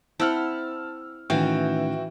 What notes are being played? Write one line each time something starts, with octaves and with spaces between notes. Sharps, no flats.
C4 E4 F#5 G5 A5 E6 F6
A2 D#3 E3 C#4 F#4 F5 G5